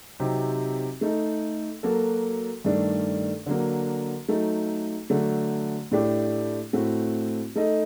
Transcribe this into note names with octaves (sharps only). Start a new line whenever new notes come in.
C3 F#3 C4 D#4 G4
A3 D#4 A4
F#3 A#3 F#4 A4
G2 D#3 A3 D4 A4
D3 F#3 A#3
F#3 A3 D#4 A4
D3 F#3 A3
A2 A3 D4 G4
A2 A3 C4 F#4
A3 D#4 A4 D#5